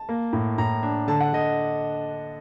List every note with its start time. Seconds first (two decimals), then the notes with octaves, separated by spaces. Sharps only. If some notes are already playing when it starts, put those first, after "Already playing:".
Already playing: A5
0.09 A#3
0.33 A2
0.58 A2 A#5
0.83 D4
1.08 D3 A5
1.21 F#5
1.33 D3 D#5